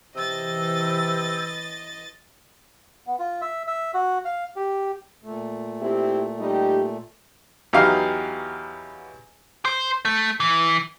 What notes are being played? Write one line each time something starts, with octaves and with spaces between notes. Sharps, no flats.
C3 E3 D#5 E6 G6 A6
B3
F4
E5
E5
F#4
F5
G4
A#2 A3
C4 E4 G4
G3 D#4 G4
E2 F#3 B3 D#4 G4 F5
C5
A3
E3